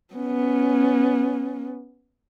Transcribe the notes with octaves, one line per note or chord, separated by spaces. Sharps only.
B3 C#4